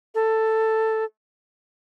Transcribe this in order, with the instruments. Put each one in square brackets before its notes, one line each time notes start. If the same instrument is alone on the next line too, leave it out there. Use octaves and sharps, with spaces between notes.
[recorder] A4